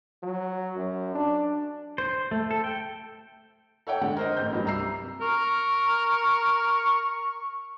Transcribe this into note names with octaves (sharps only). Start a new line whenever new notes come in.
F#3
F#2
D4
C5
A3
A4
G5
A4 C#5 F#5 G5
D3 G#3 F#5
A#4 C5 D#5
A1 G6
G2 F#3 G3
C2 A#5 E6 C7
A#4 C#6